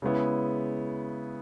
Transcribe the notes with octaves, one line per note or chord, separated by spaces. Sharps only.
C#3 G#3 B3 E4